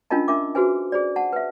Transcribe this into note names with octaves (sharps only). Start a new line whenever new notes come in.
C#4 D4 F4 A#4 D#5 A5
D4 A#4 E5 D6
F#4 G#4 B4 C5 G#5
G#4 C5 D5
F#5 A5
B4 E5